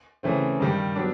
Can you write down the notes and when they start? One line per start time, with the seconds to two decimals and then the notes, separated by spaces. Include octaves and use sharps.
0.23 C#3 E3 A3 C4
0.60 G2 D#3 G3
0.96 F#3 B3 D4